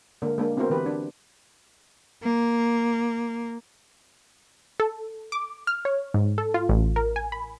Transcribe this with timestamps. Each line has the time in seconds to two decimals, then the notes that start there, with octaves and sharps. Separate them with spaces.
0.22 D3 G#3 A#3 D4 A#4
0.38 G#3 A#3 D4
0.57 B3 C4 E4 F#4 A#4 C5
0.70 D3 E3 G4 B4
0.86 D4
2.23 A#3
4.80 A4
5.32 D6
5.67 F6
5.85 C#5
6.14 G#2
6.38 A4
6.54 F4
6.69 A1
6.96 A#4
7.16 G#5
7.32 B5